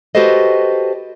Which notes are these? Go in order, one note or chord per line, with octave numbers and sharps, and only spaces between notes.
F#4 G4 A4 B4 C5 D#5